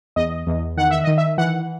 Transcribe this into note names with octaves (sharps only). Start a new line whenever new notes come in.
E2 D#5
E2
D#3 F#5
E5
D#3 D#5
E5
E3 F#5